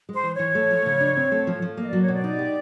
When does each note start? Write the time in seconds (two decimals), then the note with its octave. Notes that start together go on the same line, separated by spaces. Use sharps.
0.09 G#3
0.14 C5
0.24 E3
0.34 E3 C#5
0.55 A3
0.71 F3
0.86 C#3
1.01 D4
1.17 C4
1.32 A3
1.47 F3
1.62 F3
1.77 A#3 D#5
1.90 F#3 D5
2.02 C#5
2.08 B2 D5
2.24 D#4
2.39 G4